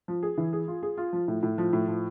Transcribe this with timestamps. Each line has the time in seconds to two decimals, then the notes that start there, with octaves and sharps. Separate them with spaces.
0.08 F3
0.23 G#4
0.38 E3
0.53 G#4
0.68 F4
0.83 G#4
0.98 F4
1.13 F3
1.28 A2
1.43 A2
1.58 F3
1.73 A2
1.88 F3